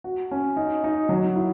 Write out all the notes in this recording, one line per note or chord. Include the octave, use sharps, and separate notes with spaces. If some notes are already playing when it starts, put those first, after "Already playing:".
F#4
C#4
D#4
D#4
F#3
E4